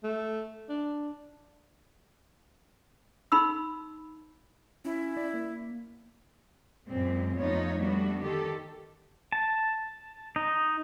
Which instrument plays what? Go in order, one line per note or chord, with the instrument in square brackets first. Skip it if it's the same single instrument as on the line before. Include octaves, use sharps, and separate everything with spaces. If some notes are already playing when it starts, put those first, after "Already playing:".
[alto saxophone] A3
D4
[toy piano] D#4 B5 C6 E6
[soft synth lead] C#4 [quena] E4
[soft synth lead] D5
A#3
[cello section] F#2 A#2 G#3 C4
F2 A3 B3 D#4 F4 C#5
G3 A3 B3 D4 F#4
D3 D#3 G4 A4
[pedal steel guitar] A5
D#4